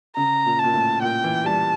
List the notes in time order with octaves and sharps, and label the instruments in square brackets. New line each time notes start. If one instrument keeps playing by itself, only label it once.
[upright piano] C#3 [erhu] A#5
[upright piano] A#2
[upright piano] A#2 [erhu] A5
[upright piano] A2
[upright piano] A#2 [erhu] G5
[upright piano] E3
[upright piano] G3 [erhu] A5